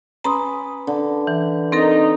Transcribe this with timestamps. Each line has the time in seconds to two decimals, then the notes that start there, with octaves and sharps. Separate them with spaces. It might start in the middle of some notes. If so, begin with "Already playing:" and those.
0.24 C#4 B4 A#5 C6 D6 D#6
0.87 D3
1.27 E3
1.72 C4 D#4 A4 A#4